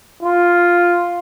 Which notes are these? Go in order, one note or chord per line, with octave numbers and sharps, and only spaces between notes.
F4